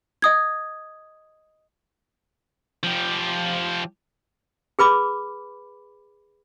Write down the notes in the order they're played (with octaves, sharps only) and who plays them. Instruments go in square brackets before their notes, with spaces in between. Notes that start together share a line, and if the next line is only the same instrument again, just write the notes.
[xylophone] D#5 D#6 G#6
[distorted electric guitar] F3 G4
[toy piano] G#4 B4 B5 D6